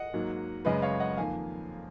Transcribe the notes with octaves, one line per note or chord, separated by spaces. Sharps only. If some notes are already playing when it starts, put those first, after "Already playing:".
Already playing: D#5 F#5
G#2 F#3 A#3
F#2 C#3 G#3 B4 D#5
C#5 F5
D#5 F#5
F2 D#3 A#3 F5 G#5